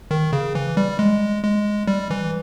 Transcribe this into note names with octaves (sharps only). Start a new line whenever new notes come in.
D#3
C#3
E3
G3
G#3
G#3
G3
E3